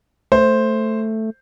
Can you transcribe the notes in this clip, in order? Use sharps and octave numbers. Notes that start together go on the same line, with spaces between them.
A3 C5